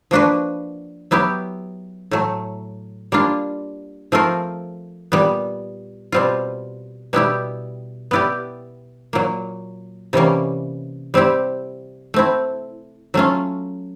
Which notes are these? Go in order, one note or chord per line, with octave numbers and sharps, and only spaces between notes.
F3 A#3 D4 F#4 B4
F#3 B3 E4 G4
A2 F#3 A3
G3 A#3 D4 F4
F3 A3 C4 F4 A#4
A#2 G3 B3
B2 G3 C4 F4
B2 G3 B3 E4 G4
B3 E4 G4 B4 D5
A#2 F#3 A#3
C3 E3 G3 A#3 C#4
G3 C4 E4 G4
A3 C4 E4
F#3 A3 C#4 F4